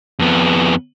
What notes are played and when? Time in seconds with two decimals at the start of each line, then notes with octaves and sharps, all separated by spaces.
0.19 F2 B3